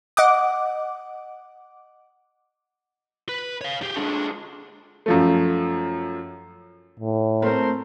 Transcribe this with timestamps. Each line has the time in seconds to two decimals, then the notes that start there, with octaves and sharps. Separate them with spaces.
0.17 D#5 F#5 D6
3.29 B4
3.61 C#5 F5
3.82 G4 G#4
3.97 D3 G#3 D4
5.06 F#2 F3 A3
7.00 A2
7.42 A3 C4 A#4 C5